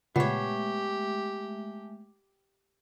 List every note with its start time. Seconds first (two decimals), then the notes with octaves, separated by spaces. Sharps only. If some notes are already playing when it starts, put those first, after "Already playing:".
0.16 A#2 C#3 G#3 A3 B3 G4 C#5 E5